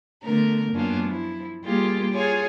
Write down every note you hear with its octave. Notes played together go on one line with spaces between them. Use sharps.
D3 A3 B3 A#4
F#2 A#3 B3 C#4 D4 F4
F3 E4
G3 A#3 F4 G4 G#4
F4 G#4 C#5 G#5